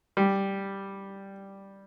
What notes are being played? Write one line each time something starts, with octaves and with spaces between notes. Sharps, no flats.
G3